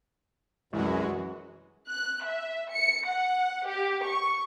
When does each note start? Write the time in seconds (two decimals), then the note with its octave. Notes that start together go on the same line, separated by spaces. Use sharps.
0.73 C2 F#2 E3 G#3 F#4 B4
1.89 F#6
2.26 E5
2.70 C#7
3.06 F#5
3.67 G4
4.05 C#6